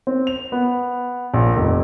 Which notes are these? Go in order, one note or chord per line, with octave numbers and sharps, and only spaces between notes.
C4
F7
B3
A#1
F1